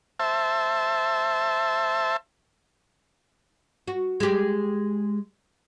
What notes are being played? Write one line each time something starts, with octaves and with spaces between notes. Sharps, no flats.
C5 E5 A5
F#4
G#3 G4